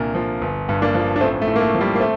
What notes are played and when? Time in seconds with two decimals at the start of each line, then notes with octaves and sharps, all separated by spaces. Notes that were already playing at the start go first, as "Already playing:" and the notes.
Already playing: C2 A#2 D3 A#4
0.15 F3
0.42 G1
0.69 G2
0.82 A#3 D4
0.95 F3
1.16 D4
1.21 A1 A3 C4
1.42 A3
1.47 A2
1.56 A#3
1.60 A3
1.75 F3
1.80 G3 A#3
1.95 A#3
2.00 A3 C4